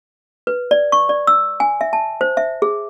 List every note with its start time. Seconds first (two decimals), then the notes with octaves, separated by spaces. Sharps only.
0.47 B4
0.71 D5
0.92 C#6
1.09 D5
1.27 E6
1.60 G#5
1.81 E5
1.93 A5
2.21 C5
2.37 E5
2.62 G#4